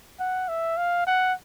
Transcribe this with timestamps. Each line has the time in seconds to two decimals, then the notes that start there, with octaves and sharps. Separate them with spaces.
0.19 F#5
0.48 E5
0.77 F5
1.07 F#5